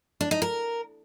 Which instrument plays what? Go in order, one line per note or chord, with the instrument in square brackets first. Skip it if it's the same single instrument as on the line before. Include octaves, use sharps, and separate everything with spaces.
[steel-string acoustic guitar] D4
D#4
A#4